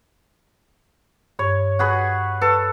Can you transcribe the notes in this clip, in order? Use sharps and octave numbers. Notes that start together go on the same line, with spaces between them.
G2 C#5
F#4 G#4 B4
A4 B4